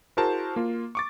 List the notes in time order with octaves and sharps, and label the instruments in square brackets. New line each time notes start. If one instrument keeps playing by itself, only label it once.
[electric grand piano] E4 F#4 G#4 A#4 C5 A5
A#3 F4
C#6 D6 A6